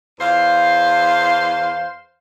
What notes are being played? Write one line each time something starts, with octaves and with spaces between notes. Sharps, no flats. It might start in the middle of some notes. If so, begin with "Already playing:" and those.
E2 C5 F5